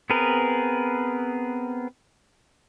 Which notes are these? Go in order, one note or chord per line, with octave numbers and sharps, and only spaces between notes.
B3 C4 G#4 A#4 B4